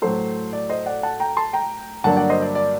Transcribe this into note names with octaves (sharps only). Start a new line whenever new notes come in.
A2 F#3 A3 C5
D5
C5 D#5
D5 F#5
F#5 A5
G5 A#5
A5 C6
G5 A#5
G2 D3 F#3 A#3 F#5 A5
D5 F#5
C5 D#5
D5
D5